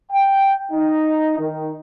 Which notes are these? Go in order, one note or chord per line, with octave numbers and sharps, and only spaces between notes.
G5
D#4
D#3